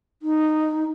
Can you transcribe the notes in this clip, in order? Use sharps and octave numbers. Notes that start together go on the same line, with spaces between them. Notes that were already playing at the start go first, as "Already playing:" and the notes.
D#4